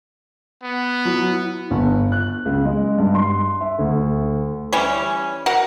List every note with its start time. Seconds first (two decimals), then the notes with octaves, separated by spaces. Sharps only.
0.63 B3
1.05 F#3 E4
1.71 G1
2.12 F#6
2.46 C#2
2.65 G#3
2.98 G2
3.15 C6
3.61 E5
3.79 D2
4.73 E3 G3 C#4
5.46 F#4 A#4 F#5